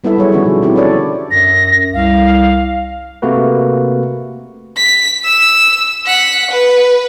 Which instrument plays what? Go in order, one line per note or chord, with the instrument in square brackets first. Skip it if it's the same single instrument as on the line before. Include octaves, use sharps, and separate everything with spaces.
[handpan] G3 B3 E4 A4 E5
F#3 G#4 C#5
D3 D#3 F3 C#4 F#4
B2
B3 C4 E4 G4
D4 A4 C#5 D5 E5
[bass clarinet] F#2 [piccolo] A#6
[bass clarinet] C2 [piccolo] F5
[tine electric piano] C3 A3 A#3 F#4 B4
[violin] B6
E6
F#5 B6
B4